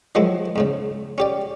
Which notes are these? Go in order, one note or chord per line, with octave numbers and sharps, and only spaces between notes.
D#3 F3 F#3 G#3 E4
E2 G#2 C#3
C#4 G4 D5